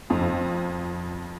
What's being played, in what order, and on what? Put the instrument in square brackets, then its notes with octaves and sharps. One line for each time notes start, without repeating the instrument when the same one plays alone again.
[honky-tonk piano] F2